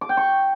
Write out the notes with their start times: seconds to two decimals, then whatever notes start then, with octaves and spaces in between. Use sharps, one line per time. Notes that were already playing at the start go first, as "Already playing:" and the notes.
0.01 D6
0.09 G5
0.17 C#6